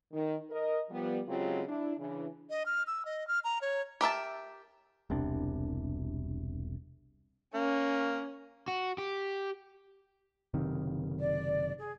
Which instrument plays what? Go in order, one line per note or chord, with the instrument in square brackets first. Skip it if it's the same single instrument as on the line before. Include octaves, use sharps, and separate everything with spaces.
[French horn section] D#3
A#4 D#5
F3 G3 B3
C#3 F#3 G#3 C4 F4 G4
D4 E4
C#3 E3 D4
[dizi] D#5
F6
E6
D#5
F6
A#5
C#5
[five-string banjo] G4 A#4 E5 A5
[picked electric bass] E1 C2 C3 D4
[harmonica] A#3 [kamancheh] C#4
[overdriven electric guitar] F#4
G4
[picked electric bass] F#1 C3 D#3
[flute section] D5
G#4